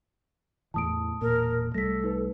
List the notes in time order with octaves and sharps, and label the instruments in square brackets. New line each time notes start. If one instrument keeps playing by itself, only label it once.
[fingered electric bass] E2 A2 E3 [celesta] A5 D#6 D7
[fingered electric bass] E1 A#2 [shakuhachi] A#4
[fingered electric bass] C2 G3 A3 [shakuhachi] A4 [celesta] A#6 B6
[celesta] D#4 B4